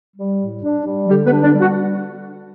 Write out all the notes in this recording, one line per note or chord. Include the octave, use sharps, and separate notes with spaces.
G3
A2
D4
G3
D3 G3 G4
B3 B4
D4
D4 D5
G3
F#4 F#5